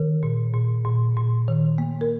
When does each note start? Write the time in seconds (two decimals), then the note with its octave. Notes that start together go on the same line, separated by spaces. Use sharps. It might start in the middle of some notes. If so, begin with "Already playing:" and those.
Already playing: D#3 A#4
0.23 A#2
0.54 A#2
0.85 A#2
1.16 A#2
1.48 D#3
1.78 A#3
2.01 A#4